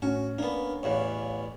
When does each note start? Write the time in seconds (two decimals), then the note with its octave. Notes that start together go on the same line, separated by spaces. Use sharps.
0.02 A2 C#4 F#4
0.38 A#3 B3 D4
0.83 A1 E2 E3 C#5 F5 F#5